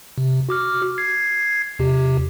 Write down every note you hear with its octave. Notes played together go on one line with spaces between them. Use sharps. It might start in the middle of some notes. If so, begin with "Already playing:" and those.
C3
F#4 D6 F6
G#6 C7
E2 C3 G4